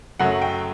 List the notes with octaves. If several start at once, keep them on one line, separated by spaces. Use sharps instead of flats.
F#2 C#3 F#3 A3 F#5
G5